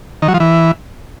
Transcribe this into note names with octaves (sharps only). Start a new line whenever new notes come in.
D#3
F#3
F3
E3